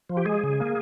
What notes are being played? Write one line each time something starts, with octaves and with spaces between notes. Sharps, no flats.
F3
G4
G#3 G#4
C#3
A#3